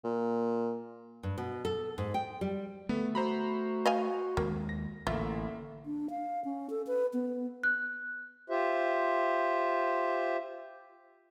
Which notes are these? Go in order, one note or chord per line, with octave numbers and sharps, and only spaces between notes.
A#2
G2
B2
A4
G#2
G5
G3
D3 A3 B3
F#4 C5 A#5 B5
D#5 F5 G#5
D#2 G#3 A#3
A#6
A1 D3 A#3 F4 E5
D4
F5
C#4
A4
B4
B3
F#6
F4 G4 C5 E5